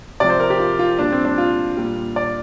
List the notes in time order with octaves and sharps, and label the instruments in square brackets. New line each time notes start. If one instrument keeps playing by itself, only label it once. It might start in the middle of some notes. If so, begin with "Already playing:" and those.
[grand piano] C3 F3 D5
C5
A#4
G4
F4
F4
A#2 G3 D4
C4
D4
F4
A#2 G3
D5